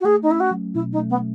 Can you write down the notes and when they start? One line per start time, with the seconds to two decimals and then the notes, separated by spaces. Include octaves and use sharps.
0.01 F#4
0.04 A3 G#4
0.23 D#4
0.28 C#4 E4
0.40 F#4
0.51 F#3
0.74 B2 E4
0.92 D#4
0.98 A3
1.10 B3